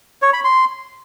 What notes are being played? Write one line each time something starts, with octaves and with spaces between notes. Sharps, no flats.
C#5
B5
C6